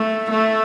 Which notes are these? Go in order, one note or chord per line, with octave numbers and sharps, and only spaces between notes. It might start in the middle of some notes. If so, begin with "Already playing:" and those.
Already playing: A3
A3